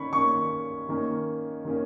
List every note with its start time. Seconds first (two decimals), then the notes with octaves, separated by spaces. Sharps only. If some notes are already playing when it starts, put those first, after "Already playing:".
Already playing: D#3 A#3 C#4 B5 C#6
0.12 D#3 A#3 C#4 C#6
0.89 D#3 A#3 C#4
1.65 D#3 A#3 C#4